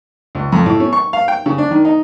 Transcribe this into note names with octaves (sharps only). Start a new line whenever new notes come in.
C#2
F2
A2
C#4
C#6
F5
G5
C#3
D4
D#3
D#4